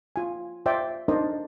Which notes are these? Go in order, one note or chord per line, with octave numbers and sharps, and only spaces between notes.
F4 G#5
F4 C5 D5 E5 G5
D4 D#4 A#4 C5 D5 D#5